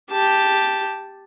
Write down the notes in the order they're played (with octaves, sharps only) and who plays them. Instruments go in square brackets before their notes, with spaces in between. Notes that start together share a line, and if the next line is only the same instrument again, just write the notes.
[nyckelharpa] G4 A5